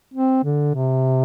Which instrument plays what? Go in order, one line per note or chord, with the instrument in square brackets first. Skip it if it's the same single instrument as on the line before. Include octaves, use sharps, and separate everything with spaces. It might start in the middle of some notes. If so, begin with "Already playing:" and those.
[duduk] C4
D3
C3